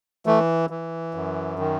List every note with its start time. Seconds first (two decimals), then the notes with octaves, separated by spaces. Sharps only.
0.26 E3 A3
0.70 E3
1.15 F#2
1.59 D#3